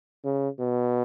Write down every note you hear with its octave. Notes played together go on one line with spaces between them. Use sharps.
C#3
B2